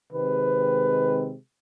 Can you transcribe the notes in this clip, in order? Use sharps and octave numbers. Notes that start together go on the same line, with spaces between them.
C3 D#3 G#3 C4 B4